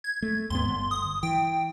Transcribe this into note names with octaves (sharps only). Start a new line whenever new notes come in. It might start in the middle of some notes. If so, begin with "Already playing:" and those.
G#6
A3
D#2 G#2 B3 C6
G1
D#6
E3 G5